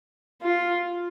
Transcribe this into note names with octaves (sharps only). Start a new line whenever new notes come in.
F4